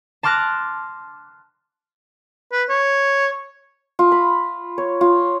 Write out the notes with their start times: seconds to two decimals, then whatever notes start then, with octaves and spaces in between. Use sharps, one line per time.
0.23 A5 C6 D6 F6 F#6 A#6
2.52 B4
2.69 C#5
3.99 F4
4.12 B5
4.78 C#5
5.01 F4